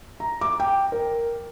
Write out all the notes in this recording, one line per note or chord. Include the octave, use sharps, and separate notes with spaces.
A#5
D6
G5
A#4